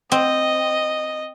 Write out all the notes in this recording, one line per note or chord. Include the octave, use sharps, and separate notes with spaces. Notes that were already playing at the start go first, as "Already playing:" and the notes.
C4 D#5